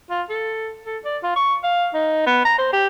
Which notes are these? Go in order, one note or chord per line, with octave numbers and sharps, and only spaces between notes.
F4
A4
A4
D5
F4
C#6
F5
D#4
B3
A#5
C5
G4